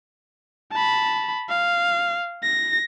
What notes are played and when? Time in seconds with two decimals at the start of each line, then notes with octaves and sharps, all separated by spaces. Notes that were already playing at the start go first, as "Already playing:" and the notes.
0.72 A5 B5
1.49 F5
2.43 A#6